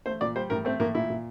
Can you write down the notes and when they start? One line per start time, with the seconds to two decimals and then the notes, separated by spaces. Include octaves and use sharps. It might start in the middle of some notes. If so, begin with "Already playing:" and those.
0.06 A3 C5
0.21 A#2 D5
0.36 G3 C5
0.50 A2 A#4
0.65 A3 C4
0.80 A2 A#3
0.94 A#2 E4
1.10 A#2